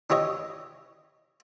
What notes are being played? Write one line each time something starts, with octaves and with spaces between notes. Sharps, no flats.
D4 E4 G4 C#5 D#5